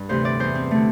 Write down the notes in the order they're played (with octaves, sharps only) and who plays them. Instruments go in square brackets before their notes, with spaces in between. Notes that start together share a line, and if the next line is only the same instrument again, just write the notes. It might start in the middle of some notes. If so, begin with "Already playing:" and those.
Already playing: [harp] G2
D2 C3 E3 C5
D5
E2 E3 C5
C4
D3 A3